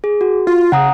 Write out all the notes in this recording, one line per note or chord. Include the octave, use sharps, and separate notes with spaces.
G#4
F#4
F4
C#3 F#5 A#5 D#6